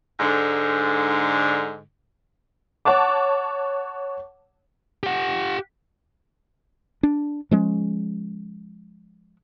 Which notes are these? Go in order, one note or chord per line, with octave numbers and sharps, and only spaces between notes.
G#2 D3
C#5 F#5 A5 D6
G4 F#5
D4
F3 G#3 C#4